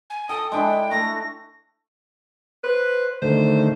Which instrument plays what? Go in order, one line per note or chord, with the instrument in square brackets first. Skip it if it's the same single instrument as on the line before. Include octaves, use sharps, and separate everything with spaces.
[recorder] G#5
[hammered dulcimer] A4 G5 [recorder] D#6
[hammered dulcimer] G#3 D4 E4 [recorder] G5
[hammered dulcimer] A3 [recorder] A#6
[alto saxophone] B4 [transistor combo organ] C5
[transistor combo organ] D3 D#3 A3 [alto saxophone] C5